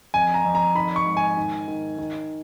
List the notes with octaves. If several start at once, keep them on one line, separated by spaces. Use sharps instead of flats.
F2 G#5
A#5
F2
A#5
D#3 B5
C#6
G#2
G#5
D#3
D#3
D#3